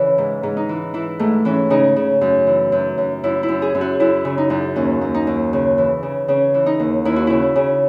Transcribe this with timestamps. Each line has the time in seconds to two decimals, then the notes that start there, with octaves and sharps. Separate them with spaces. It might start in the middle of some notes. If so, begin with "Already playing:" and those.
Already playing: C#3 E3
0.18 G#2
0.43 G#2
0.57 D#4
0.69 E3
0.94 E3 E4
1.19 G#2 A3
1.45 E3 C#4
1.70 C#3 D#4
1.96 C#3
2.21 F#2
2.47 E3
2.72 F#2
2.98 F#2
3.24 F#2 E4
3.43 E4
3.48 F#2
3.62 G#4
3.75 F#2
3.81 F#4
4.00 F#2 E4
4.25 C#3
4.38 D#4
4.50 F#2
4.76 D#2 C#4
5.01 D#2
5.14 D#4
5.27 D#2
5.53 C#3
5.78 E3
6.03 C#3
6.28 C#3 C#4
6.54 E3
6.66 D#4
6.80 D#2
7.05 D#2 E4
7.16 F#4
7.27 C#3 E4
7.56 C#3